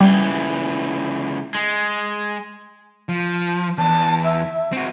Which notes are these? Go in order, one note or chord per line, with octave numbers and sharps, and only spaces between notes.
C#2 E3 G3
G#3
F3
E2 A5
E5
C4 F#4